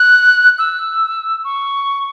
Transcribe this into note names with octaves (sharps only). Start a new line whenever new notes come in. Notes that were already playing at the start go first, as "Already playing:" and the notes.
Already playing: F#6
E6
C#6